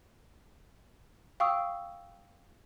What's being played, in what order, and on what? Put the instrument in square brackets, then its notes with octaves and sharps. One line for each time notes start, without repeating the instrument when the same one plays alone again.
[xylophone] F5 G5 C#6 D#6 E6